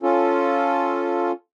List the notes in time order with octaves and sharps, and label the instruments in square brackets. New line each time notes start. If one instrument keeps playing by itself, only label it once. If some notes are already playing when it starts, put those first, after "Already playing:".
[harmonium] C#4 F4 A4